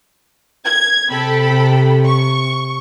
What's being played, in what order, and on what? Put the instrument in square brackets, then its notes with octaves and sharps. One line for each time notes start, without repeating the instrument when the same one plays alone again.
[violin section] G#6
[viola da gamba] C3 [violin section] A4 G5 B5
[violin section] C#6